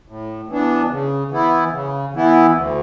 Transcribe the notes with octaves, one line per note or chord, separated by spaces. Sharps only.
A2
E3 B3 D4
C#3
E3 B3 E4
C#3
E3 B3 E4
D2